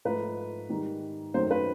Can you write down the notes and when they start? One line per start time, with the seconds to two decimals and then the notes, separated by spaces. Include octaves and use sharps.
0.05 G#2 F3 A3 B4
0.69 G#2 D#3 G3
1.34 F#2 D#3 F#3 A3 C5
1.51 B4